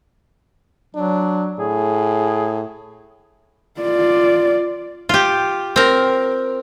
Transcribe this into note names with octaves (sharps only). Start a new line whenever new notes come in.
F#3 D4
A2 G#4
F4 D5
F4 G4
C4 A#4